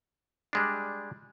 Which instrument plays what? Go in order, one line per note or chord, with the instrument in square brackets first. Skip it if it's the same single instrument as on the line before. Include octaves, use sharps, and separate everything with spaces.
[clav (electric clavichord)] G3 G#3 D4